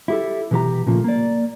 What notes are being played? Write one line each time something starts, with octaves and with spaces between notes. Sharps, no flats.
E4 G4 A4
B2 E3 G4 A#5
A#2 C#3 F3 A3 A#3
A#3 D5